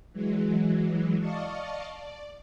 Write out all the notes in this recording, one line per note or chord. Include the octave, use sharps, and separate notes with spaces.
E3 F#3 G#3
D5 D#5 F5 A5 C#6
D5